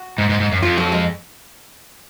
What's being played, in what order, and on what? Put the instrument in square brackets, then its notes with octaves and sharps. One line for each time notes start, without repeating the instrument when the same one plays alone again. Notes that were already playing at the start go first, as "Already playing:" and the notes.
Already playing: [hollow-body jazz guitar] F#4
[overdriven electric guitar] G#2
G#2
G#2
F#2
[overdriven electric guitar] F2 [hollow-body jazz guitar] F4
[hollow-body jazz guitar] F#3
G#3